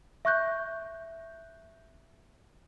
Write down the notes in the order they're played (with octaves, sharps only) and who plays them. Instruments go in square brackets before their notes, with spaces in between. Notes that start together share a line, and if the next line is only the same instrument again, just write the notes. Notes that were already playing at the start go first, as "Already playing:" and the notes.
[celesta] E5 C#6 F#6 G6